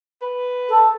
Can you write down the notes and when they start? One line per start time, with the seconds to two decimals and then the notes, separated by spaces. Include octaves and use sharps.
0.22 B4
0.69 A4